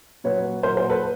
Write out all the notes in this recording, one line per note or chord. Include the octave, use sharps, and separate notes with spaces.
A#2 F#3 B4 C#5
A#2 F#3 A#4 C5
A#4 C5
A4 B4